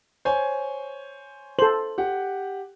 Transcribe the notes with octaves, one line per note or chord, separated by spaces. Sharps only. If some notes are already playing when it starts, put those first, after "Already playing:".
C5 C#5 G#5
A4 C5 F#7
G4 F#5